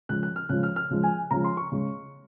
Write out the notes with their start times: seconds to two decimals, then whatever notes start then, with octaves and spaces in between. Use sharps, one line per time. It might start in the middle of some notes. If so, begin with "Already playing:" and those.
0.09 C#3 F3 G#3 F#6
0.23 F#6
0.36 F6
0.49 C#3 F3 G#3 F#6
0.63 F6
0.76 F6
0.90 C#3 F3 G#3
1.03 G#5
1.31 C#3 F3 G#3 A#5
1.44 C6
1.57 C#6
1.72 C#3 G#3